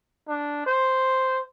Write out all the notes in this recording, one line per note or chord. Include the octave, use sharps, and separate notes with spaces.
D4
C5